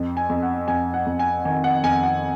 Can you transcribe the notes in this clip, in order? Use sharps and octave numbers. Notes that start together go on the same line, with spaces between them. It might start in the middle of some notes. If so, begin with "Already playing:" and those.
Already playing: F2
G#5
F2
F#5
F2 G#5
F#5
F2
G#5
D#3 G#5
F#5
F2 G#5
F#5